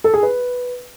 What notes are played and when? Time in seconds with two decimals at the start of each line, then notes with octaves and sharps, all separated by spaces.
0.04 A4
0.14 G#4
0.23 B4